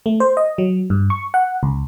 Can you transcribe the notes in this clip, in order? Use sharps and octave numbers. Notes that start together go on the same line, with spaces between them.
A3
C5
D#5
F#3
G2
C#6
F#5
C#2